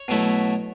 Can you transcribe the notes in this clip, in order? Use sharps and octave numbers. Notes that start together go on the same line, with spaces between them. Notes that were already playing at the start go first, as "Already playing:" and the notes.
Already playing: C#5
B2 F#3 A3 E4